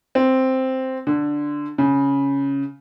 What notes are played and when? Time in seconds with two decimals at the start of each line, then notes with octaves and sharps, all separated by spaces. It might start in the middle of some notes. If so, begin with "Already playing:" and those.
0.15 C4
1.07 D3
1.78 C#3